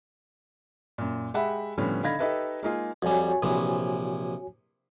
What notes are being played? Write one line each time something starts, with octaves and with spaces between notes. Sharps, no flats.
F#2 A#2
G#3 G4 E5 F#5 B5
A2 D3 F3 G3 B3 C#4
D3 D#4 F5 B5 G#6 A#6
D#4 G4 A4 B4 D#5 E5
G#3 A#3 D#4 F4 G#4
F2 G3 F#4 C#5 G#5
A#1 C3 E3